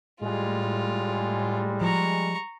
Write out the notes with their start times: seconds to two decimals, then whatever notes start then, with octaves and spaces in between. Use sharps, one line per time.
0.21 A2 G3 G#3 F4
1.82 F3 A#5 C#6